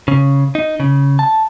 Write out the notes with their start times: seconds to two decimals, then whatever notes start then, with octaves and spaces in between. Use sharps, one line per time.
0.08 C#3
0.55 D#4
0.80 C#3
1.19 A5